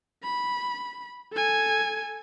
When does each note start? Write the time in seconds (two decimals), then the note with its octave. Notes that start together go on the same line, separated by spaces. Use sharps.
0.23 B5
1.33 A4 G#5